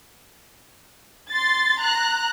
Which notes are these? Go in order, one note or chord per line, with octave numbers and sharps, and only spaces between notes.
C6 A6
A#5 F#6